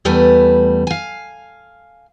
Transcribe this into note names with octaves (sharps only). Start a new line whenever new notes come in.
E2 G3 A3 B4 G#5
F5 G#5